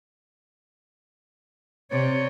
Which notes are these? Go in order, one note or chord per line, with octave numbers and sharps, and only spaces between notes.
C3 C#5 D5